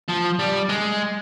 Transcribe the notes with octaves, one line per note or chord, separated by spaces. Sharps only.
F3
G3
G#3